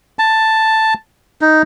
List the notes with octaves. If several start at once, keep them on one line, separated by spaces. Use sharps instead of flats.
A5
D#4